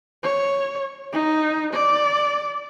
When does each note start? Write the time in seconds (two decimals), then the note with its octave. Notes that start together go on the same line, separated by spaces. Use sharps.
0.23 C#5
1.12 D#4
1.73 D5